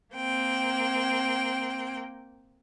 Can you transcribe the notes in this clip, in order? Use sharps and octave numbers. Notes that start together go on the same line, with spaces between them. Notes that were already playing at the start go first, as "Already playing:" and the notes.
A#3 C4 G5